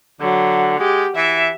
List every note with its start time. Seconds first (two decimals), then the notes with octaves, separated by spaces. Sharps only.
0.21 D3 F#3
0.79 G#3 G4
1.16 E3 E5